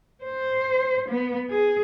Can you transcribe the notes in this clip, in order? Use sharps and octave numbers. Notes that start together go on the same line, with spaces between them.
C5
B3
G#4